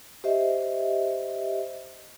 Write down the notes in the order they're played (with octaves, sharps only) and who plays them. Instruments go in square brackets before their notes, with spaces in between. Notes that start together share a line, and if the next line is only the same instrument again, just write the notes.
[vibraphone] G4 C5 D#5 E5